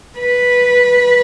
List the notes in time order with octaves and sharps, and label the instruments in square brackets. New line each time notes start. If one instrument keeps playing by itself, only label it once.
[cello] B4